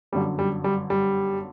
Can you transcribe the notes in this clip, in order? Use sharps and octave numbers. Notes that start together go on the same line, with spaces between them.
G1 F#2 D3 G3
G3
G3
G3